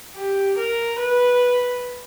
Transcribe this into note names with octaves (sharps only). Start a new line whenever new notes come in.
G4
A#4
B4